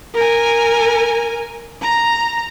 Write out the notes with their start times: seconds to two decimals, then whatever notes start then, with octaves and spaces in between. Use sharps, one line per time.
0.14 A#4 G#5
1.82 A#5